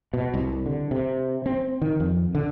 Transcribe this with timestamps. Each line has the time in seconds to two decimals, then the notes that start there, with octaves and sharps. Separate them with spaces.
0.13 B2
0.34 C2
0.66 D3
0.91 C3
1.46 C4
1.82 D#3
2.00 F2
2.35 D3